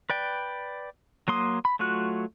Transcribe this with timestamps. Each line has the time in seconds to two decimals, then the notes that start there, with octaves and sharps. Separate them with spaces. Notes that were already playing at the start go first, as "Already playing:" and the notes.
0.10 B4 D5 G5
1.28 F#3 A#3 C6 D#6
1.65 B5
1.79 F#3 A3 F4 F#4 F#6